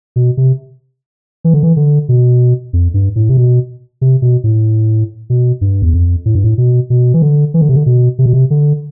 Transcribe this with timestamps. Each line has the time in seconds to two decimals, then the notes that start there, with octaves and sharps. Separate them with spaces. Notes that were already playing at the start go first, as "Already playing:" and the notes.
0.16 B2
0.37 C3
1.44 E3
1.54 D3
1.63 E3
1.76 D3
2.09 B2
2.73 F2
2.94 G2
3.16 A2
3.29 C3
3.37 B2
4.01 C3
4.22 B2
4.44 A2
5.30 B2
5.61 G2
5.82 E2
5.94 F2
6.26 A2
6.35 G2
6.44 A2
6.58 B2
6.90 B2
7.14 E3
7.22 D3
7.54 E3
7.61 D3
7.69 C3
7.76 D3
7.86 B2
8.19 C3
8.26 B2
8.33 C3
8.50 D3